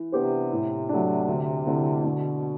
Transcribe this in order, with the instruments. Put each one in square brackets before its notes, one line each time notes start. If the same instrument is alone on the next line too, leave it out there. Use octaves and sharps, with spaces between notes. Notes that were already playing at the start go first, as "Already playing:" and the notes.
Already playing: [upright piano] E3
[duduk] C3 [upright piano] B3 D4 G4 C5
[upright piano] A2
F#3 A3 D4
D2
D3 A3 C4 E4
[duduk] B2 [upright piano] D3